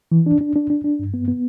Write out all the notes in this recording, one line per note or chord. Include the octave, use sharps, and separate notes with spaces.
E3
D4
D4
D4
D4
D4
G2
B3
B3